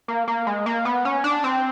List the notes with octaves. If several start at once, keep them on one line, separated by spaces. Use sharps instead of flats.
A#3
A#3
G#3
A#3
B3
C#4
D4
C4